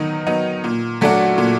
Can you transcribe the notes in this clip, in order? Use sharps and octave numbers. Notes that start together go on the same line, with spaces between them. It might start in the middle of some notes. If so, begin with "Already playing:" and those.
Already playing: D#3 F#3 B3 D#4
F#3 B3 D#4
A#2
F#3 A3 D4 F#4
A#2